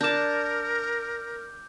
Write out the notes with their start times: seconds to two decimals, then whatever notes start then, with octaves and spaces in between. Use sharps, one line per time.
0.01 D4 A#4 A5 D6 G6